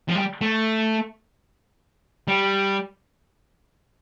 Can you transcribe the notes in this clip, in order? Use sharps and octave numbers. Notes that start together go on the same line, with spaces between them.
F3
G3
A3
G3